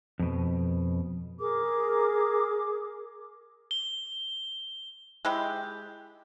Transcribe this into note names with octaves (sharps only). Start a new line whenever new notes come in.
F2 B2
G#4 A#4 D6
G7
G#3 E4 G4